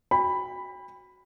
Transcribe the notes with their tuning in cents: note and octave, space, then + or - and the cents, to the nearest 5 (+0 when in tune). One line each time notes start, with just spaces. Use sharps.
F#4 +0 G5 +35 B5 +0